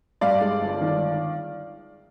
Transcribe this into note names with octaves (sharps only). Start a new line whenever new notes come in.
G2 D5 F5
G#3
G1
D#3